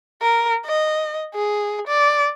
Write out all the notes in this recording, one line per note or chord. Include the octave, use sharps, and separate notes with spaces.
A#4
D#5
G#4
D5